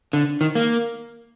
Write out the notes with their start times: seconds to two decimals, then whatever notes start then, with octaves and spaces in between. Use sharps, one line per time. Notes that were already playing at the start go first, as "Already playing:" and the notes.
0.13 D3
0.41 D#3
0.55 A#3